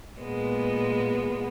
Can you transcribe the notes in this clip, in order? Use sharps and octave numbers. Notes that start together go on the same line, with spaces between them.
A#2 G#3 B3